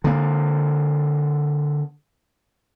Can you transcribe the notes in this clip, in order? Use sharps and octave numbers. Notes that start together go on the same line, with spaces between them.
D3 A#3